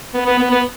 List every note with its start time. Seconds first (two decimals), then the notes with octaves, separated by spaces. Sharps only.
0.14 B3
0.25 B3
0.38 B3
0.50 B3